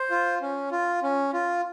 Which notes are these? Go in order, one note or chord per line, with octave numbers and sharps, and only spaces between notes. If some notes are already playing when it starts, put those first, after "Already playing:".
Already playing: C5
F4
C#4
F4
C#4
F4